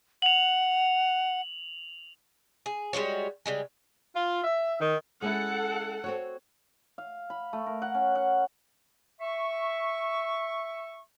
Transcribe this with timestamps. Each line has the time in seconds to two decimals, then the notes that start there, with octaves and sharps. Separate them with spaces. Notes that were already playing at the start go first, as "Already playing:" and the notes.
0.22 F#5 F7 F#7
2.66 G#4
2.93 G3 G#3 F#4 C#5
3.46 C#3 G3 G#3
4.15 F4
4.44 E5
4.81 D#3
5.22 G#3 C#4 E4 A4 F#5
6.04 C4 F#4 C#5
6.98 F5
7.30 B5
7.53 A3
7.66 A#4
7.82 F#5
7.95 C#4
8.15 F#5
9.21 E5 C#6